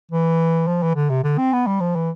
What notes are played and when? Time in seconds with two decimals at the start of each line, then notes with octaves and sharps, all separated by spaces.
0.11 E3
0.67 F3
0.82 E3
0.96 D3
1.10 C3
1.24 D3
1.38 C4
1.53 B3
1.67 G3
1.80 F3
1.95 E3